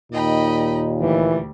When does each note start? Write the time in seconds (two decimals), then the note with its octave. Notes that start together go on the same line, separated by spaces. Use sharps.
0.12 D#2 A#2 D#4 D#5 G5 B5
1.01 D2 E3 G3